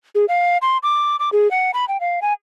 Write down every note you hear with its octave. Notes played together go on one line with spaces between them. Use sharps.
G#4
F5
C6
D6
D6
G#4
F#5
B5
G5
F5
G#5